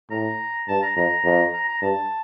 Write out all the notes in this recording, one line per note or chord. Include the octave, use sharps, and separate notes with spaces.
A2 A#5
G2 A5
A#5
F2 A#5
F2
A#5
A#5
G2 A5